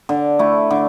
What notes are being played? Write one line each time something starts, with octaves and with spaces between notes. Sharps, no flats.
D3
A3 E4
D3